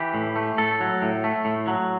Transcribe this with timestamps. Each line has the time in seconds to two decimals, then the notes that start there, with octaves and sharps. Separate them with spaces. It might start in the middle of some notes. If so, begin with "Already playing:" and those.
Already playing: E3 G4
0.14 A2
0.36 A3
0.58 A2 A4
0.81 F#3
1.02 A2
1.24 A3
1.45 A2
1.67 F#3